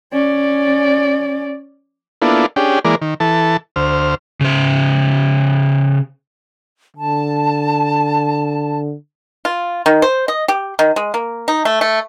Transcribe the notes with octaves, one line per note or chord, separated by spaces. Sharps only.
C#4 D5
A#3 B3 D4 E4 F4 A4
C#4 D4 G4 G#4 G5
E3 G#3 A#3 A#4 D5
D#3
E3 A4 A5
D2 C5 F6
C#3 C5
D3 A5
F4
D#3
C5
D#5
G4
D#3
G#3
A#3
D#4
A3
A3